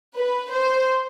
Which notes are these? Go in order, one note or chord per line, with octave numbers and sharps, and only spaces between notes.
B4
C5